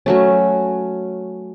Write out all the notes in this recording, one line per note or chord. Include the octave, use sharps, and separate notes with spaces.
F#3 A3 C#4